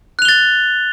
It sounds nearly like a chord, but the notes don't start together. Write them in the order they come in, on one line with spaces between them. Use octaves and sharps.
F#6 F7 G7 A6